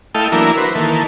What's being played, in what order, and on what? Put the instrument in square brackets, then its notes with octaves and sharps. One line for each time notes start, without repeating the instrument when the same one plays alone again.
[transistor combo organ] A3 E4 A4 D#5 F5 G5
E3 F#3 A#3 D4 E4 A#4
F#4 B4 C5
D#3 E3 A#3 A4